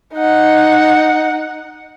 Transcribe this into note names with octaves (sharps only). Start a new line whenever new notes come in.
D#4 F#5